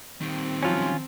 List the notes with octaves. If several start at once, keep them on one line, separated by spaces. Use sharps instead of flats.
D#3 G3 C4
F3 F#3 C#4 F4